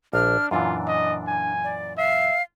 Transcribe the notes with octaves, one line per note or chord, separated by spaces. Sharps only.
A#1 D4 F6
F#2 A#2 E3 D4 F4
D#5
G#5
D5
E5 F5